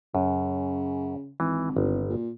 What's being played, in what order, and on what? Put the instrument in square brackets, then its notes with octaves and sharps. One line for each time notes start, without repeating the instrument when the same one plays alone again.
[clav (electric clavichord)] F#2 [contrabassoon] C#3
[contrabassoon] G#1 [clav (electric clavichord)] E3
[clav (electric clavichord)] G1
[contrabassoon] A#2